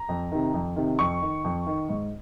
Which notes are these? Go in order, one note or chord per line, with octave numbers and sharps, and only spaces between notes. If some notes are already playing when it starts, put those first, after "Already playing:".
Already playing: A#5
F2
C3 D#3
F2
C3 D#3
F2 C#6
D#3
F2
D#3
G#2